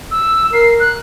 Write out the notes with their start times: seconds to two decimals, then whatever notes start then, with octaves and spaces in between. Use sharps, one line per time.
0.11 E6
0.53 A#4 C7
0.79 F#6